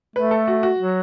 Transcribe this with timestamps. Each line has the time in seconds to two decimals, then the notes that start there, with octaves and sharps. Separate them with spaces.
0.16 A3 B4
0.31 A4
0.48 F#4
0.63 F#4
0.78 F#3